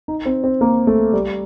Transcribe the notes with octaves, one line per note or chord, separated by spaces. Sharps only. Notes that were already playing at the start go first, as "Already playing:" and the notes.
D#4
C4
C4
A#3
A3
G3